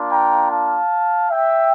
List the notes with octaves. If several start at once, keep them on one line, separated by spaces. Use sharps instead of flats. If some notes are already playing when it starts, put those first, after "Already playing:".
Already playing: A#3 D4 F4
G5 A#5
F5 A5
E5 G5